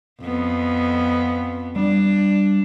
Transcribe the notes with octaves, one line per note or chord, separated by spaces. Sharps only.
F2 B3
G3 D4